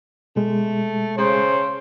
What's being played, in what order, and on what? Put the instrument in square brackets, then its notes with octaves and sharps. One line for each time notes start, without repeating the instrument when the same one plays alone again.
[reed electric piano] B2 G#3 [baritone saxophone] A3
[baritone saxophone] C#3 [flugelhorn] C5